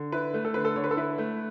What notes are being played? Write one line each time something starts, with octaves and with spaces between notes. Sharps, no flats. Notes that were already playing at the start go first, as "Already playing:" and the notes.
Already playing: D3
E4 B4
A3
A4
D3 B4
A4
D3 C#5
B4
A4
E4 B4
A3